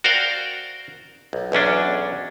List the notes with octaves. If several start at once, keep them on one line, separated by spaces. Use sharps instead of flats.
F#4 A#4 C5 D5 F5 G5
B1
B1 E2 C#4 D4